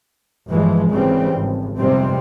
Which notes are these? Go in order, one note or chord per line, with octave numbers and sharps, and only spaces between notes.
G1 E3 F3 G#3
G#1 C#3 E3 G3 C4
G#1
G1 F2 G#2 C3 G3 C4